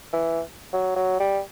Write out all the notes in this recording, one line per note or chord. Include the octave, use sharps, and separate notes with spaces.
E3
F#3
F#3
G3